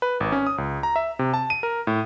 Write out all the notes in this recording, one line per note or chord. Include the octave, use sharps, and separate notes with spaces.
B4
G#1
C#4
D#6
C#2
A#5
E5
C3
A5
D#7
A#4
A2